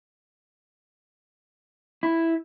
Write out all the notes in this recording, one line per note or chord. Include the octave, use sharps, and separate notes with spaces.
E4